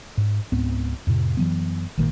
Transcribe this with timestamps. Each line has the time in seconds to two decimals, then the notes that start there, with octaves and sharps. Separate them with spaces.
0.17 G#2
0.52 C#2 G#2 B3 C4
1.07 F2 A2 C3
1.37 F#2 E3 F#3 B3
1.97 G#1 A#2 D#3 A#3